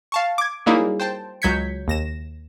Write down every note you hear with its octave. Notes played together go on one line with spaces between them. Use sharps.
F5 A5 C#6
D6 G#6
F#3 G3 A#3 D#4 E4 G#4
C5 G5 A5
C#2 F#3 G6 G#6 B6 C#7
D#2 A#6 E7